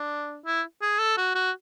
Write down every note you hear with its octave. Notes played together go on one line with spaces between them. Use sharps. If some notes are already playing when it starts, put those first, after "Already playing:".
Already playing: D4
E4
G#4
A4
F#4
F#4